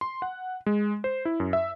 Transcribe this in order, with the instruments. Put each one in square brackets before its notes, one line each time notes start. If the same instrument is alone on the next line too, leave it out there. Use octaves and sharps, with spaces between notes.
[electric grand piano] C6
F#5
G#3
C5
E4
F#2
E5